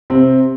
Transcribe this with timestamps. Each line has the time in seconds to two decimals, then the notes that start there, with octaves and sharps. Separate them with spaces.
0.10 C3 C4